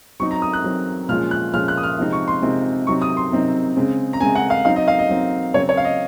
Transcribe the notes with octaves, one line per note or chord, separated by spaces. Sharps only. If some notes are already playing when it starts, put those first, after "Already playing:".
F#3 C4 D#4 C#6
A#5
D#6
F#6
F#3 C4 D#4
A#2 F3 G#3 C#4 F4 F6
F#6
A#2 F3 G#3 C#4 F4 F6
F#6
D#6
F6
C3 F3 G#3 C4 D#4
C#6
C6
C3 F3 G#3 C4 D#4
C3 F#3 C4 D#4 C#6
D#6
C6
C3 F#3 C4 D#4
C#3 G#3 C4
A#5
C#3 G#3 C4 G#5
F#5
F5
F#3 C4 D#4 F5
D#5
F5
D#5
F#3 C4 D#4
C#3 F#3 C4 C#5
C#5
F5
D#5